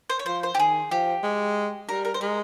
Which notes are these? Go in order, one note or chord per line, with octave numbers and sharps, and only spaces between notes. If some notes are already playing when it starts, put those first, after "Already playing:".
C5
C#5
F3 C5
C5
G4
D#3 G#4
F3 G4
G#3
G3 A#4
A#4
C5
G#3 A#4